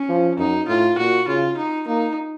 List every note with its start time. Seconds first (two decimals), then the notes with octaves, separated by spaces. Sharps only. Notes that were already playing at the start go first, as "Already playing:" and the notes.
Already playing: C#4
0.09 F3
0.38 F#2 D#4
0.68 A2 F4
0.98 A#2 F#4
1.27 C#3 F4
1.57 D#4
1.87 A#3 D#4